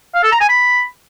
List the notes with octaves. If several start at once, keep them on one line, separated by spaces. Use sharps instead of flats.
F5
A4
A#5
G#5
B5